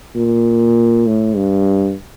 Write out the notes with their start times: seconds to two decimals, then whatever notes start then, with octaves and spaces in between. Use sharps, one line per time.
0.15 A#2
1.06 A2
1.36 G2